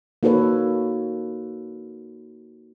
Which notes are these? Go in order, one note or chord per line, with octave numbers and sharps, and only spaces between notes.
A#3 D#4 F#4 A4 B4 C#5